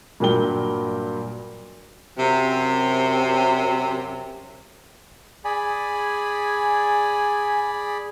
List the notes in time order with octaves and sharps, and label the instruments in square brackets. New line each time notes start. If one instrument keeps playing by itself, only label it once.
[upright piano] G2 A#2 F#3 A#4 G5 G7
[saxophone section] F#2 C3
[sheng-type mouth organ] G#4 D5 B5 [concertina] G#5